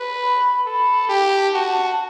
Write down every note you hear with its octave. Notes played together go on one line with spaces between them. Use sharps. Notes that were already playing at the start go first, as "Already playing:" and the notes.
Already playing: B4
B5
A4 B5
G4 A5
F#4